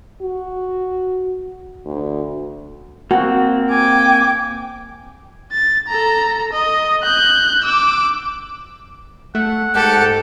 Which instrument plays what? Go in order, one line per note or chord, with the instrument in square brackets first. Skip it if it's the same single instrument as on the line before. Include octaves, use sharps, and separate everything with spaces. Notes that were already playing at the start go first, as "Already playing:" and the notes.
[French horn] F#4
D2
[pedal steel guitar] A#3 C4 [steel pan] F#4
[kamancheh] G5 D6 [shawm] G#5
[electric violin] A6
A4 A#5
D#5
F#6 G6
D6 E6
[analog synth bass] A3 [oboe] F#5
[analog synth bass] G#2 [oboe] G4 [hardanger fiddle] A4 [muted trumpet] F#5